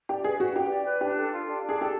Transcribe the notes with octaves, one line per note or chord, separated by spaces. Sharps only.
G4 D5
G#4 B4
F#4 B4
G4 G5
D5
B4
D4 G4
A4
F4
D4
D4
G#4
G4 A4